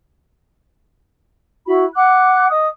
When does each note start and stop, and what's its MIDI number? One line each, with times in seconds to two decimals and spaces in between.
1.66 1.84 64
1.66 1.84 66
1.66 1.84 83
1.95 2.46 78
1.95 2.46 86
1.95 2.46 90
2.50 2.68 75
2.50 2.68 87